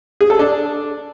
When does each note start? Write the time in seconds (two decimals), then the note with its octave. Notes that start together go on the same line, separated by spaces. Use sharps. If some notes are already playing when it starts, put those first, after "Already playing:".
0.21 G#4
0.30 A4
0.39 D4